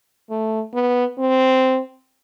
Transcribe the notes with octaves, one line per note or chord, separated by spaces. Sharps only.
A3
B3
C4